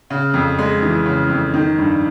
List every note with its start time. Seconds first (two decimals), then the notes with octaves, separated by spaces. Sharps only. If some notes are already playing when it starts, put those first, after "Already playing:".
0.10 C#3
0.34 F2
0.58 G#3
0.82 E3
1.06 C#3
1.30 F2
1.54 D#3
1.78 G2